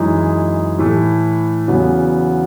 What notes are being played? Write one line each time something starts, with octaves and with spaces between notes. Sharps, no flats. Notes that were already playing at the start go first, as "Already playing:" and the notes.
Already playing: F#2 E3 G#3 D#4
A2 E3 A3
E2 C#3 F#3 B3